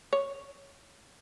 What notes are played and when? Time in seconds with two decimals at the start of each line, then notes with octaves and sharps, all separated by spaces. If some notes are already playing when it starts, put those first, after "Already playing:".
0.13 C#5